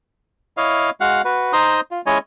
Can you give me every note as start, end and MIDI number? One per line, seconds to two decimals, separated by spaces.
0.57 0.90 64
0.57 0.90 73
0.57 0.90 75
0.57 0.90 77
1.00 1.22 56
1.00 1.22 66
1.00 1.22 77
1.00 1.22 78
1.25 1.53 66
1.25 1.53 71
1.53 1.80 63
1.53 1.80 72
1.53 1.80 82
1.53 1.80 84
1.53 1.80 87
1.91 2.01 65
2.06 2.18 56
2.06 2.18 61
2.06 2.18 64
2.06 2.18 73
2.06 2.18 75
2.06 2.18 80